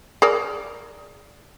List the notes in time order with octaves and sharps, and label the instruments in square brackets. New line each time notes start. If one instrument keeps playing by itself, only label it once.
[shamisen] G#4 A#4 D5